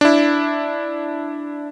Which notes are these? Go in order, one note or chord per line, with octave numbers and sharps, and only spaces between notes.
D4 E4